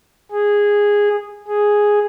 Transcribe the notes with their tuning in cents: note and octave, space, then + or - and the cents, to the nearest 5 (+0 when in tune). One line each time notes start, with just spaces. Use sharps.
G#4 -10
G#4 +0